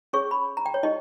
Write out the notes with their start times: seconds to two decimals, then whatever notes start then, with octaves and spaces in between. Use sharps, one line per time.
0.13 C#4 G#4 C#5 C#6
0.31 B5
0.57 A#5
0.66 G5
0.74 C#5
0.83 D#4 G4 D#5